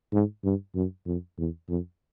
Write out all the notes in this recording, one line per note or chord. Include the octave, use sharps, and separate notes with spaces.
G#2
G2
F#2
F2
E2
F2